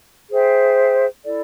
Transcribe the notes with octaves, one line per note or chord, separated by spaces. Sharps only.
G#4 C5 E5 G5
E4 A4 D5